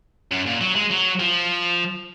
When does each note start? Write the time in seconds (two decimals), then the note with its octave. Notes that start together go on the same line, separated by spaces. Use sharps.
0.31 F#2
0.46 A#2
0.61 F#3
0.75 G#3
0.91 F#3
1.20 F3